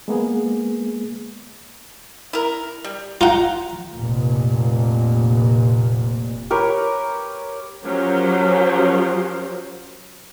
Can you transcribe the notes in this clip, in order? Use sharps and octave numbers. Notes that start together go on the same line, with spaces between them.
G#3 A#3 B3 G#4
E4 A#4
G3
F4 F#5 G5 A#5
F1 A#2
G4 A#4 B4 C#5
F3 F#3 C#4 G4 A#4 C5